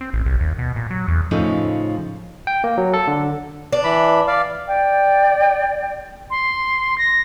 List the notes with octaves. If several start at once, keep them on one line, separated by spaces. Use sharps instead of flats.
C4
A1
C2
D#2
B2
A#2
F#3
E2
A2 C#3 F3 A3 C#4 D#4
G5
A#3
F#3
A4
D3
D4
E3 B5
D5 F5
D5 G5
C6
A#6